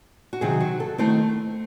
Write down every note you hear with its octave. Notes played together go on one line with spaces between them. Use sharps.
F#4
C3 D#3 F#3 C4 G#4
F#4
A4
D#3 A3 C4 E4 C5